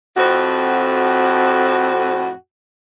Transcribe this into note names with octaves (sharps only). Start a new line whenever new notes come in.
F2 A2 C4 F#4